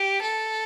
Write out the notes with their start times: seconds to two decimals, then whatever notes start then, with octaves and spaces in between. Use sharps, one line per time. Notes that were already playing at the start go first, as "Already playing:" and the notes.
Already playing: G4
0.22 A4